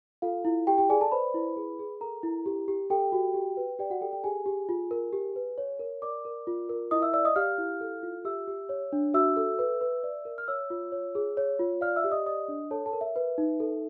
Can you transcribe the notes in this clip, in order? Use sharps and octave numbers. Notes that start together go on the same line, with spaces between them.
F4 A4 F5
E4
G4 G5
G4 G5
G#4 D5 G#5
A4 A5
B4 C5 B5
E4
G#4
G#4
A4 A#4 A#5
E4
G4
G4
G4 A4 G5
F#4
G4
B4
G4 D5 G5
F#4 F#5
G4 A4 G5
G4 G5
G4 G#4 G#5
G4
F4
A#4
G4
B4
C#5
A#4
A#4 D5 D6
A#4
F4
A#4
E4 D#5 D#6
E5 E6
D5 E5 E6
D#5 D#6
G4 F5 F6
E4
A4
F4
G4 E5 E6
G4
C#5
D4
F#4 E5 E6
A4
B4
B4
D5
A#4
F6
C#5 E5 E6
F4
C#5
G#4
C#5
F4
D5 F5 F6
E5 E6
G4
D#5 D#6
D5 D#5 D#6
D4
A4 C#5 A5
A4 A5
A#4
E5
B4
D#4
A4